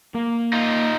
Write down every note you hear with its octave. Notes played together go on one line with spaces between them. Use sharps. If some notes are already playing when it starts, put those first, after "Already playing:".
A#3
D#4 F4